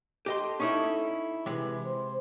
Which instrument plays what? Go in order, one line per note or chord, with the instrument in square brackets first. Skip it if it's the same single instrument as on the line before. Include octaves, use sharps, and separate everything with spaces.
[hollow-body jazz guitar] G4 D#5 C6 [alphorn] A4
[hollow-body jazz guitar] C#4 D#4 E4
[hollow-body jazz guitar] C3 G#3 [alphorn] E3
[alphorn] C5